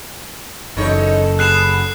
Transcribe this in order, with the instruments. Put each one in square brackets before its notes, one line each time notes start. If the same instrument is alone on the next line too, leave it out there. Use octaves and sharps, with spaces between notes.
[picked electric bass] F#1 C#3 [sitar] E2 D#4 C#5 [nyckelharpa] A4
[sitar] B3 G#4 [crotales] F#6 C7 E7